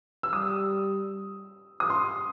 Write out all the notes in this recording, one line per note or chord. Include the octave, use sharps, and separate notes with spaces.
E6
G3 D#6
D#6
C6